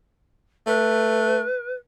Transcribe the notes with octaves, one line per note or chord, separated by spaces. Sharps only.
A3 B4